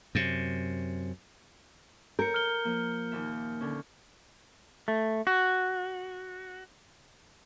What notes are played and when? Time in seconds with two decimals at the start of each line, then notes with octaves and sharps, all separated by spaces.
0.15 F#2 C3
2.19 A#4 G6 C#7
2.34 F6 G7
2.65 F3 A#3
3.12 D#2 A#2 E5
3.60 D3 C#4
4.88 A3
5.27 F#4